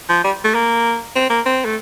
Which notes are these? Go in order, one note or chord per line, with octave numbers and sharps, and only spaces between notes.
F3
G3
A3
A#3
C4
A#3
C4
A3